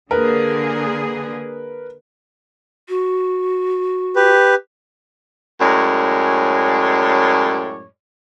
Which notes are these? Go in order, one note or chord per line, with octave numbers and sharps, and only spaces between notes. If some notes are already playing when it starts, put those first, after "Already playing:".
D3 A#3 G#4 A#4 B4
F#4
G4 B4
F#2 A2 G#3 C#5 D5